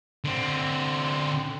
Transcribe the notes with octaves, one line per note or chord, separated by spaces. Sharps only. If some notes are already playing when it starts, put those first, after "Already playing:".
D3 C4